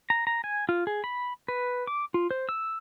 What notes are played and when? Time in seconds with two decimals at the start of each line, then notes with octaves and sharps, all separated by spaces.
0.10 A#5
0.27 A#5
0.44 G#5
0.69 F4
0.87 G#4
1.04 B5
1.48 B4
1.87 D6
2.14 F4
2.31 C5
2.49 E6